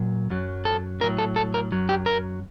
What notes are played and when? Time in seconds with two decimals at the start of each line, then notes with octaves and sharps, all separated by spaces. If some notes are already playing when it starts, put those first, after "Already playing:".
Already playing: A#2 F#3
0.30 F#2 F#3
0.65 A4
1.01 A2 F#3 A#4
1.19 A4
1.36 A4
1.54 A#4
1.72 F#2 F#3
1.89 G4
2.06 A#4